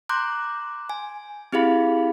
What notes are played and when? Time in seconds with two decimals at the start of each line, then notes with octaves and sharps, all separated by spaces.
0.09 A#5 C6 D6 F#6 G6
0.90 G#5
1.53 C4 E4 G4 G#4 F5 B5